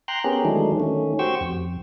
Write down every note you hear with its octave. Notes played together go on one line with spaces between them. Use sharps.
G5 A#5 C6 F#6
B3 C#4 G4 G#4 A#4
D#3 E3 F#3 G#3 A3 D4
D#3 A3 C#4
F#4 G4 C5 G5 C#6 E6
F2